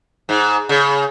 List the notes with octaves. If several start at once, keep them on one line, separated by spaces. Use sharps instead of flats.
G#2
C#3